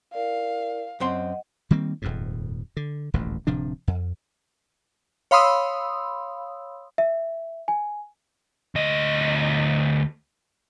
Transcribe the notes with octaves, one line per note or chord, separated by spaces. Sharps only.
E4 A#4 D5 F5
F#2 C4 D#5 F#5 C6
D#3 G3 A#3 C4
D#1 F2 G#2
D3
D#1 A1 D2 G#2
D1 C3 F3 D4
F2
C#5 F5 B5 C6 D#6 E6
E5
G#5
D2 D#5